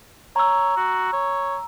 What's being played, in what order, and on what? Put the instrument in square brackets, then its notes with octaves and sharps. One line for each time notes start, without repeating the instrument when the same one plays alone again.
[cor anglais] C#5 [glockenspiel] A#5 E6
[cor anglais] F#4
C#5